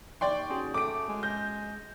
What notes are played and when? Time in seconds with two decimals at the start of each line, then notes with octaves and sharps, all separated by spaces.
0.21 D#2 D5 G5 C6 C#6
0.50 C#4 F#4 G#4
0.74 A3 D6 D7
1.09 G#3
1.23 G6 A#6